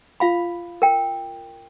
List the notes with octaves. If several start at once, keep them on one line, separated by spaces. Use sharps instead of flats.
F4 F5 B5
A#4 G5